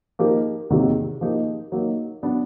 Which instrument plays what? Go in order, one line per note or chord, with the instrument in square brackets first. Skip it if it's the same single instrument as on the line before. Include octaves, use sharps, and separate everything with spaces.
[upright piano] F3 A#3 D#4 G4 A#4
E2 C3 D#3 F#3 A#3
F3 A#3 D#4 G4
F#3 A#3 D#4
F#3 B3 D4